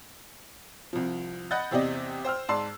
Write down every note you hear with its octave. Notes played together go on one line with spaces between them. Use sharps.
C2 F3
D#5 F#5 B5 F#6 G6 A6
E2 C3 G4 D5 D#5
C5 G5 E6 F6
G#2 D5 A5 C6 E6 C7